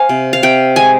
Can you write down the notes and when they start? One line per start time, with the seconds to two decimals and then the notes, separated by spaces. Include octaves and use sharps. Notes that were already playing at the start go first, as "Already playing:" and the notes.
Already playing: C5 F5 G#5
0.09 C3
0.33 F5
0.43 C3 G5
0.76 G#3 G#5